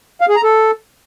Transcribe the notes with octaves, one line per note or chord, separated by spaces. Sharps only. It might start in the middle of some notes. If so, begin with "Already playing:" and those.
F5
G#4
A#5
A4